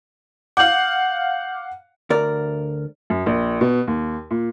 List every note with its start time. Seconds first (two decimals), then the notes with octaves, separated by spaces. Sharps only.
0.57 F5 F#5 D6 G6 F#7
2.10 D2 A#4 D5
3.10 F#2
3.26 A#1
3.61 B2
3.87 D#2
4.31 A#2